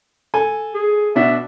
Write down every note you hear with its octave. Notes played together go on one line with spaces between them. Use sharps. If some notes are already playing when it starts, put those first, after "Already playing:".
A4 G#5
G#4
B2 D4 F#4 E5